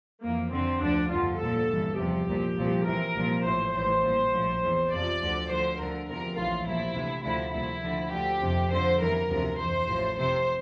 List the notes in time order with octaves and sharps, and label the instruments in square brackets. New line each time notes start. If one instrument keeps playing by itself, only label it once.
[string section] F2 E3 A#3
F2 D3 F3 C4
D2 D3 F3 D4
G1 F2 D3 F4
C2 A#2 F3 A4
G1 G2 E3
E2 C3 F3 G4
C2 A#2 F3
C2 A#2 F3
C2 C3 E3 A#4
C2 A#2 F3
A1 A2 E3 C5
A1 A2 E3 C5
C2 A#2 F3
A#1 A2 F3
E2 E3
F2 C3 F3 D5
D2 D3 F3
D2 D3 F3 C5
D2 D3 F3 A#4
E2 C3 F3 A#4
A#1 A2 E3 F4
C2 A#2 F3 E4
D2 C3 E3
D2 D3 F3 E4
C2 A#2 F3 E4
D2 D3 F3
D2 D3 F3 G4
F2 C3 F3
F2 D3 F3 C5
G1 F2 E3 A#4
D2 C3 F3
F2 E3 C5
A1 A2 F3
F2 C3 F3 C5